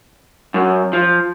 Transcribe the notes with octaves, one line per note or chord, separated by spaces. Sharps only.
F#2
F3